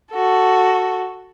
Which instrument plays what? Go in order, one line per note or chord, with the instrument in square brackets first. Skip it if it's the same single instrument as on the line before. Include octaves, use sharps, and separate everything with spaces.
[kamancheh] F#4 A4